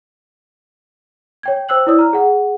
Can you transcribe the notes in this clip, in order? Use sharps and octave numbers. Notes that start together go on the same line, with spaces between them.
C#5 G5 G#6
C5 G5 E6 F#6 F#7
E4 C#5 D5 D#6 E6
A#5 F6
G#4 F#5